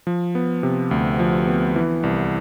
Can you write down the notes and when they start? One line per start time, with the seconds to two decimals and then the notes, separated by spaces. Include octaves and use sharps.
0.07 F3
0.35 B3
0.63 C3
0.91 D2
1.19 F3
1.47 B3
1.76 E3
2.03 C2